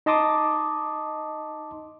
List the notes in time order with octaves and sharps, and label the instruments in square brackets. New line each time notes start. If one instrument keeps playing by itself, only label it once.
[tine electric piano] D#4 D#5 A5 C6 D6 D#6